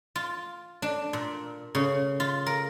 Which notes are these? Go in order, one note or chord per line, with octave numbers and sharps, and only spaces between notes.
F4
D4
A#2
C#3
F4
A#4